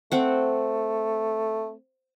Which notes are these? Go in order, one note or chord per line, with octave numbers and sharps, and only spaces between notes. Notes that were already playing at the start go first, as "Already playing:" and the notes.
A3 C4 F#5